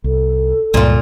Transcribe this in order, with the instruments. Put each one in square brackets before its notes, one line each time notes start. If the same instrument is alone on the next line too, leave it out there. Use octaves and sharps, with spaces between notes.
[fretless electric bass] C2 [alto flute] A4
[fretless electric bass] C#2 G2 [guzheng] A#2 F4